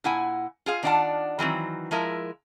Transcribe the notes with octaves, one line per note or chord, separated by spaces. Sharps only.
A#2 E4 F#5 G#5
F4 G#4 F5
D#3 D4 F4 D5 F#5 A5
D#3 E3 F#3 C4
F3 G#3 E4 A#4